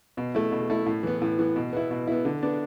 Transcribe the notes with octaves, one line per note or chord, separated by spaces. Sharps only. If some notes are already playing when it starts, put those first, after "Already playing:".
B2
A3 E4
B2
A3 E4
A2
E3 B3
A2
E3 B3
B2
B3 E4
B2
B3 E4
D3
B3 D4